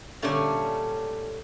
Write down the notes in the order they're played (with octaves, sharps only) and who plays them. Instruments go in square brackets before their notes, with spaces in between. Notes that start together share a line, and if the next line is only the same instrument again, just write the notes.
[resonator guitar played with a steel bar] A#2 D3 G3 A3 C#4 D4